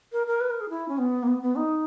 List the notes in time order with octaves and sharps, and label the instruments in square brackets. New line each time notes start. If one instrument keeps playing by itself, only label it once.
[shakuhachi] A#4
A#4
B4
A#4
G#4
E4
C#4
B3
A#3
B3
B3
D#4